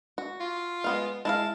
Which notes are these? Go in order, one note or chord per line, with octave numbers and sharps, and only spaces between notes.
F#4
F4
G#3 B3 F5
G#3 E4 F5 A5